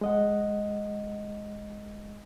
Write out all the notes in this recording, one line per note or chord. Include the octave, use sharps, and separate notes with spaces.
G#3 D#5 F#5